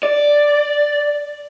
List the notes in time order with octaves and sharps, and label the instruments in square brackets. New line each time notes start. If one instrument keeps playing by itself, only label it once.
[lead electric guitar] D5